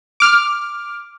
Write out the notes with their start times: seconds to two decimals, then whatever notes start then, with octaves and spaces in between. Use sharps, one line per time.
0.20 D6 F6